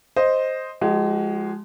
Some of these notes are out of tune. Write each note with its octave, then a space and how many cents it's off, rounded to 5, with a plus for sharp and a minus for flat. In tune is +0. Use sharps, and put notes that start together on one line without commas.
C5 +0 D#5 +0
F3 +0 G#3 +0 F#4 +45